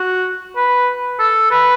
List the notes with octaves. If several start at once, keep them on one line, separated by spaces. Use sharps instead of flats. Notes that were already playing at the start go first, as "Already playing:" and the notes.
Already playing: F#4
B4
A4
B4